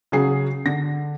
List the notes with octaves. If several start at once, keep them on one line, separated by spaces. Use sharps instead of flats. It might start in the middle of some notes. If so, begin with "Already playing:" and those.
C#3 F#3 G#4 C7
D3 A#6